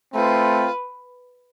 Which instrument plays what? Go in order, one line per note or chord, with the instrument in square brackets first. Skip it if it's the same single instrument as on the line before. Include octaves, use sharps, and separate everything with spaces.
[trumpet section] A3 C4 F4 [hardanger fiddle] B4